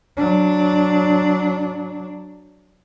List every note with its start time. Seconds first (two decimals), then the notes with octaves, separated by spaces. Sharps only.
0.17 F#3 D4